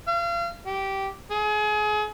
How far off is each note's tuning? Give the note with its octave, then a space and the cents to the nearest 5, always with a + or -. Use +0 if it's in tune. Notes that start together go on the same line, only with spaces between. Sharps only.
F5 -35
G4 -15
G#4 +30